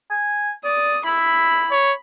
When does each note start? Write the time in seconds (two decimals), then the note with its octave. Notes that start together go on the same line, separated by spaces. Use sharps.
0.10 G#5
0.65 D5 D#6
1.05 E4 B5
1.71 C#5